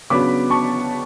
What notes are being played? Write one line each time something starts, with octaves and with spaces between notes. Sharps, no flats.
C#3 F#3 B3 D4 B5 D6
A5 C#6